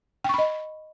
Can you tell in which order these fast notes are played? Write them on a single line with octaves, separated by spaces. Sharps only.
G5 C#6 B5 D#5